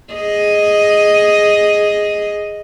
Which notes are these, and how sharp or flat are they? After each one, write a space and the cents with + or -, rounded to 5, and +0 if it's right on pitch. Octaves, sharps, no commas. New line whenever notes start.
G#4 +0 D#5 +0